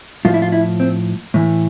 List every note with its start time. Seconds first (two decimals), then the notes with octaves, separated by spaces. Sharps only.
0.25 A2 F3 F4
0.34 E4
0.42 F4
0.52 E4
0.80 C4
1.34 A2 E3